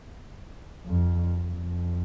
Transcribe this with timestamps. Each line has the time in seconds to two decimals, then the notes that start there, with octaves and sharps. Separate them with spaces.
0.86 F2
1.52 F2